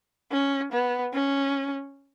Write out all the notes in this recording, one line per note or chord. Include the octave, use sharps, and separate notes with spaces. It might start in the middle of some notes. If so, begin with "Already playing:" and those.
C#4
B3
C#4